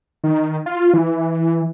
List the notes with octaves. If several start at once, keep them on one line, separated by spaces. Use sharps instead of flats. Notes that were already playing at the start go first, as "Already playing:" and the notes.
D#3
F4
E3